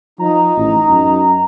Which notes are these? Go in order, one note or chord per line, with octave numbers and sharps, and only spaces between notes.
F3 D#4 A#5
A1
F#2